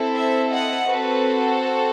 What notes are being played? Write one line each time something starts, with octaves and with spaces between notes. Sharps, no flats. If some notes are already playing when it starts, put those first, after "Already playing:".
Already playing: C4 E4 A4
C5 E5
D#5 F#5
C4 F#4 A4 B4